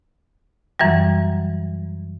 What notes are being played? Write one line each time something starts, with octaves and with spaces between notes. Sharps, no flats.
F#2 E3 F#3 G3